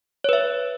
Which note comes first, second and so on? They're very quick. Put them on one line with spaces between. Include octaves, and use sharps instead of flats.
C#5 B4 E5